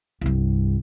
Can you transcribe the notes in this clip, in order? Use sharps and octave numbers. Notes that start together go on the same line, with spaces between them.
C2 G2